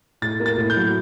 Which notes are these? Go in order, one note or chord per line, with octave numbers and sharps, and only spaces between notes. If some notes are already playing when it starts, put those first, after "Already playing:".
A2 A6
A#3
A6
A2
G6
F#3